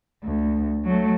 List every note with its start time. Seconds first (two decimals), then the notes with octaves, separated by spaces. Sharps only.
0.24 D2
0.85 F#3 A3